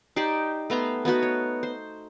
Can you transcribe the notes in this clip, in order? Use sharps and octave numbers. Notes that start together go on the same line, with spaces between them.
D#4 G4 C5 D5
A3 B3 A#5 C6
B3 D#4 F#4 B4
C#5
C5